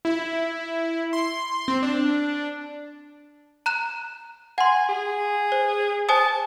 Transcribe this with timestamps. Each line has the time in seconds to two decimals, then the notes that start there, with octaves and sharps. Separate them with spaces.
0.05 E4
1.13 C6
1.68 C4
1.83 D4
3.66 A#5 F#6 E7
4.58 F#5 G#5 C6
4.89 G#4
5.52 C5
6.09 C5 G#5 A5 D#6